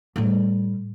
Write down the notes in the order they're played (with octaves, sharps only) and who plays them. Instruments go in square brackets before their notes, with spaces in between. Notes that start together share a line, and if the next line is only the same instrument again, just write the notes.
[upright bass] A2 G3